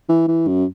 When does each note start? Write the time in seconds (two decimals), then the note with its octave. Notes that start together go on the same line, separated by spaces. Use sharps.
0.09 E3
0.28 E3
0.48 F#2